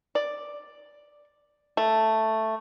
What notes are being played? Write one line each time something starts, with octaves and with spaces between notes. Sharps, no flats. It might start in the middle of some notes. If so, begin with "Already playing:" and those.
D5
A3